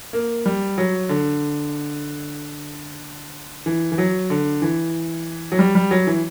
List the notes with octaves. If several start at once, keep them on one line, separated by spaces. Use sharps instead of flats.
A#3
G3
F#3
D3
E3
E3
F#3
D3
E3
F#3
G3
G3
F#3
E3